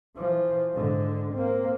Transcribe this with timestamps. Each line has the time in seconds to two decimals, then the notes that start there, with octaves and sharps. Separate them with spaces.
0.17 E3 F3
0.73 G#2 D3
1.34 A#3 C4